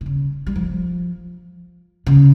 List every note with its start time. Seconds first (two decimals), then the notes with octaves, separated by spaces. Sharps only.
0.01 C3
0.06 C#3
0.46 G3
0.56 F3
2.06 C#3